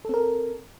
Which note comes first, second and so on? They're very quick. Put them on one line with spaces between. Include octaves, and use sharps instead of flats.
A4 C4 A#4